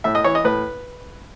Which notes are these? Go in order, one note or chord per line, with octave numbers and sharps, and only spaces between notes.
A2 E5
D#5
E3 C#5
D#5
A2 B4